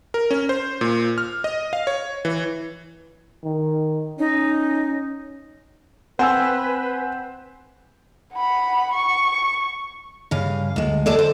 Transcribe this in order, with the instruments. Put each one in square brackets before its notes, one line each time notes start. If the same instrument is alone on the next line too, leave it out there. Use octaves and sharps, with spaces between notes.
[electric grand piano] A#4
C#4
C5
A#2
F6
D#5
F5
C#5
E3
[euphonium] D#3
[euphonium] C#4 [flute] D#4
[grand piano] C4 C5 [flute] B4 [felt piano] F#5 G#5 E6
[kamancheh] F#5 B5
C#6
[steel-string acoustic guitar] G2 C#3 F5
D2 G#3
G#3 G#4 A4 D5
C5